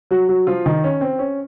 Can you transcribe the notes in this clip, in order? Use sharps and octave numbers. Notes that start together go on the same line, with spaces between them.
F#3 F#4
F#3 F#4
F3 F4
D#3 D#4
C#4
C4
C#4